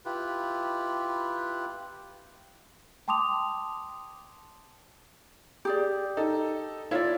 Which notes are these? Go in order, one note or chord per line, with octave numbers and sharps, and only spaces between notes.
E4 F4 G4 B4
G5 A5 C6 D6 D#6 F7
G4 G#4 D5
D#4 A4
E4 F4 C#5 D5 E5